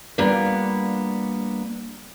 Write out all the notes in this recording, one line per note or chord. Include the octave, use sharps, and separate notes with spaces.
G3 A#3 B3 D4 F4